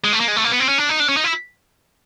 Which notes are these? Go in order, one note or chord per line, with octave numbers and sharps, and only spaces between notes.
G#3
A3
A#3
G#3
A3
A#3
B3
C4
C#4
D4
D#4
D4
C#4
D#4
E4